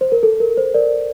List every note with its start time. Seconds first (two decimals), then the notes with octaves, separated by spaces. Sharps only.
0.01 C5
0.12 A#4
0.23 A4
0.40 A#4
0.57 C5
0.74 A#4 D5